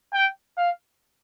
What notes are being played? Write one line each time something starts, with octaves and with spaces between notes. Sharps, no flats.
G5
F5